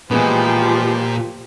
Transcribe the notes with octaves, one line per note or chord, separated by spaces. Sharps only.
A#2 E3 F3 G#3 B3 G4